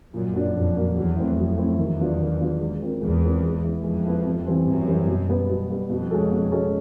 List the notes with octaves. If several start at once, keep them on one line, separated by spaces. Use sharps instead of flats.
F#2 A#2
F#3 A#3 D4
F2 A#2
F#3 A#3 D4
E2 F#3
A3 C4 E4
F2 F#3
A3 C4 E4
E2 D#3
F#3 B3 D4 F4
D#3
F#3 B3 D4 F4
G#3
C4 F4 A#4
E2 G#3
C4 F4 A#4
G#3
B3 E4
F2 G#3
B3 E4
C3
E3 G3 C4
F#2 C3
E3 G3 C4
B2
G3 B3
B2
G3 B3
F2 B2
G#3 C#4 F#4 A4
B2
G#3 C#4 F#4 A4